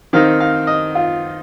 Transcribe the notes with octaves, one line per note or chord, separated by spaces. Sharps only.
D#3 C4 D#4 F5
F5
D#5
F4